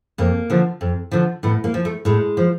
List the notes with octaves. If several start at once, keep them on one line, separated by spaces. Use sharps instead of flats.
F2 A#3
D3 F3
F2
D3 F3
A2 B3
A#3
F3
A3
A2 G#3
F3